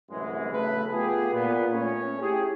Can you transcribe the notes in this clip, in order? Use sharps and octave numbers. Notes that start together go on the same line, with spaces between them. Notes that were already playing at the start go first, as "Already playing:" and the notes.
C2 F#2 A2 E3 G#3
B1 C#3 A3 A4 B4
A3 B3 F4 G4 G#4
A#2 B3
A3 C#4 C#5
E4 G4 G#4